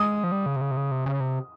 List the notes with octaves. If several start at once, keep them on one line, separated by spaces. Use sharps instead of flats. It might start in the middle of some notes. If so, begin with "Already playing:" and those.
Already playing: G#3 D#6
F3
G3
C#3
C3
C#3
C3
C#3
C3
C#3
C3